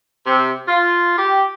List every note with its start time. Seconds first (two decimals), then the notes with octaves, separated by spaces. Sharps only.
0.25 C3
0.67 F4
1.16 G4